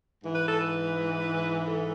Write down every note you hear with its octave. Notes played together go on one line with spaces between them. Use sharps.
G#2 E3
B4
A4
B4
A4